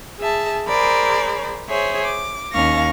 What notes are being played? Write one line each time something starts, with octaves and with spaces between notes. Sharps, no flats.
G#4 E5 A5
G#4 A#4 C5 D5 B5
G#4 C5 C#5 E5
D6
D#2 C#4 F5 C#6 A#6